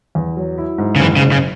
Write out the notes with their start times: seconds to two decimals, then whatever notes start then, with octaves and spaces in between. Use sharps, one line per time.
0.15 E2
0.36 F#3
0.58 E4
0.78 G#2
0.96 C#3
1.00 F#1 E3
1.16 C#3
1.22 F#1
1.32 C#3